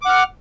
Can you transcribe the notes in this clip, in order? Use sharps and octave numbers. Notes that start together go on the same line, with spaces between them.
F#5 D6 F6